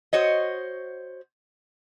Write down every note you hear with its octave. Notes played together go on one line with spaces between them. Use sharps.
F#4 C5 C#5 D#5